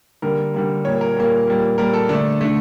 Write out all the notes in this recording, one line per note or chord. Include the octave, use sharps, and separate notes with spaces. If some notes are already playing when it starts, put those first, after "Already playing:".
D3 G3 A#3 A#4
D3 G3 A#3
A#2 G3 A#3 C#5
A#4
A#2 G3 A#3
A#2 G3 A#3
A#2 G3 A#3 A#4
A4
D3 A3 D4
D3 A3